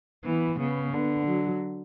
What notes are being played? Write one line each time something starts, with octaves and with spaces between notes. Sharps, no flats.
E3 B3
C#3 B3
D3 B3
F#3